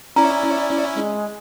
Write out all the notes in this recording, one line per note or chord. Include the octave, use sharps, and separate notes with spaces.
C#4 E4 D5 A#5
G#3